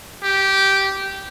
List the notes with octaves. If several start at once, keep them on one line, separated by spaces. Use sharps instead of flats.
G4